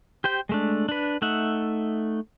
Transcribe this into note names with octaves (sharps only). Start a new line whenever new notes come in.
G4 C5 G5
G#3 A3 D4
D4 B4
A3 D#4 E5 F#5